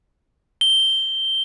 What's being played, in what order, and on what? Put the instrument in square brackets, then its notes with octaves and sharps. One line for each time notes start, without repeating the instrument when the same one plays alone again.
[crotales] G7